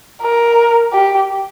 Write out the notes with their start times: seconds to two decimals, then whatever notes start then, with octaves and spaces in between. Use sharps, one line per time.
0.22 A#4
0.93 G4